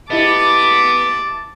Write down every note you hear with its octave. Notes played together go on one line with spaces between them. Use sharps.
B3 E4 G4 D#5 A5 D6